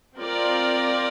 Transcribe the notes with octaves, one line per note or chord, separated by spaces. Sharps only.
C4 F4 A#4 D5